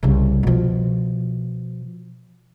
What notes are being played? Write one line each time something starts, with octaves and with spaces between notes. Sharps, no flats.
C2 C#3
B2 F3